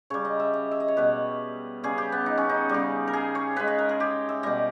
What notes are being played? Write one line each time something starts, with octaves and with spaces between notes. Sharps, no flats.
C#3 G3 C#5
D#5
E5
D#5
E5
D#5
C#5
B2 G3 B4
C#3 G3 G#4
G4
B3
D#4
C#4
D#4
C#3 G3
A#4
G#4
C#5
C#3 G#3 B4
D#5
A#4
G#4
G4
E5
B2 G3 D#5